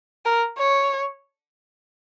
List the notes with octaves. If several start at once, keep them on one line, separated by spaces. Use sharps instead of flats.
A#4
C#5